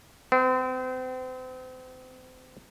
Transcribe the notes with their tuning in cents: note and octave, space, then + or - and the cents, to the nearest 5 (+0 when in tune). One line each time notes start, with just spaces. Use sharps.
C4 -35